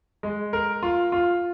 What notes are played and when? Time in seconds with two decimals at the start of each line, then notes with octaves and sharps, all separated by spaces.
0.23 G#3
0.53 A#4
0.83 F4
1.12 F4